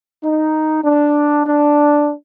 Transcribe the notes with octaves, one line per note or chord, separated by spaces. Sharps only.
D#4
D4
D4